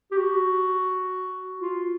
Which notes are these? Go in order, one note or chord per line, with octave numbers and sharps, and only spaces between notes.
G4
F#4
F4